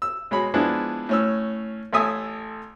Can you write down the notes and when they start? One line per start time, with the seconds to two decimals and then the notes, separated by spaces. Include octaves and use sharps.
0.02 E6
0.31 B2 G#3 C#5 B5
0.54 F3 G#3 B3 D4 E4
1.09 A2 C#4 E6
1.93 A1 A4 C#5 E5 G#5 D#6